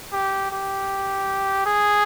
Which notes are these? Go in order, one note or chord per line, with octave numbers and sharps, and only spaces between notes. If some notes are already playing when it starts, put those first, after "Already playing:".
G4
G4
G#4